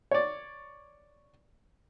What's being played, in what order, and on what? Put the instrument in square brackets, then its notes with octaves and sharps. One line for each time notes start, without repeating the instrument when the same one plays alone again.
[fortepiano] C#5 D5